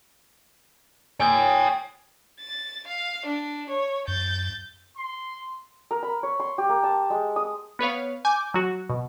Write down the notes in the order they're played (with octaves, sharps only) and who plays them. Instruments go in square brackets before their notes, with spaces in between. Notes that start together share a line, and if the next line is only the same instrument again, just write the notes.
[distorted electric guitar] C#5 G5 [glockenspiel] G#5 D#6 G#6
[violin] A6
F5
D4
C#5
[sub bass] F#2 [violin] G6 A6
[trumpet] C6
[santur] A#4
B5
C#5
C6
G4
A#3
A5
G#3
D#6
[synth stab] B3 B4 C#5 F5
G#5 D6 G6
F#3 F#4
B2